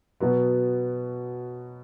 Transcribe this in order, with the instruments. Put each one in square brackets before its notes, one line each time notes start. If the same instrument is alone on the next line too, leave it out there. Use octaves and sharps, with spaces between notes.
[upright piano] B2 F#3 B3